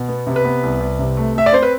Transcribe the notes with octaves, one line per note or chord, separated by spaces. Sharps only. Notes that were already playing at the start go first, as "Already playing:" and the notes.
Already playing: B2
B3
C3
B4
B3
C2
C2
C3
A3
A3 E5
D5
C4 C5
B4